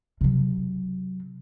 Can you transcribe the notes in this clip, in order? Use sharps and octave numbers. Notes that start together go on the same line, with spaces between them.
C3 F#3